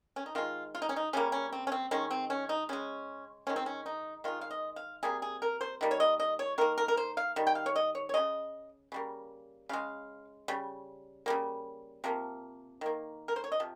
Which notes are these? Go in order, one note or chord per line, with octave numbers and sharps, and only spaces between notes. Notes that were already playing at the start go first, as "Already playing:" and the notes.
C#4
D#4
D#3 G#3 F4
F4
D#4
C#4
D#4
C#3 G3 A#3 C#4
C#4
C4
C#4
C4
D#3 G#3 C#4
C4
C#4
D#4
C#3 G#3 C#4
D#3 G#3 C#4
C4
C#4
D#4
D#3 G#3 F4
F5
D#5
F5
C3 G3 A#3 G#4
G#4
A#4
C5
D#3 G3 A#3
C#5
D#5
D#5
C#5
D#3 A#3 A#4
A#4
A#4
C5
F5
D#3 G3
G5
F5
C#5
D#5
C#5
C#5
C#3 G#3 D#5
C#3 G3 A#3
C#3 G#3 F5
C#3 G3
C#3 G3 A#3
C3 F3 A#3
D#3 A#3
A#4
C5
C#5
D#5
C3 F3